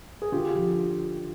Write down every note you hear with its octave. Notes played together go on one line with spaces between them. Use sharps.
G#4
D3 F4 G4
F3